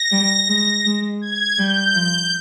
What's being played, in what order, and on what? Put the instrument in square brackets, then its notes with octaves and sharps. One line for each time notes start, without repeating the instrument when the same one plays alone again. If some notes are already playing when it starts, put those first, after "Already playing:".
Already playing: [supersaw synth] A#6
[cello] G3
G#3
G#3
[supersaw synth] G#6
[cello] G3 [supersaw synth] G6
[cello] F3